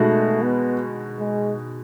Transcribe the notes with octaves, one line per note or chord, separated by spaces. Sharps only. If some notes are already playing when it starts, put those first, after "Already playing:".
Already playing: B2 G#3 A3 D#4 F#4
B3
G#3